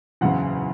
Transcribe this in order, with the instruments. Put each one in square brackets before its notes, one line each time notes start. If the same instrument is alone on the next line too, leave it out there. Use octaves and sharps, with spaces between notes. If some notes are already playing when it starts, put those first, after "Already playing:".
[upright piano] F#1 E2 C#3 F#5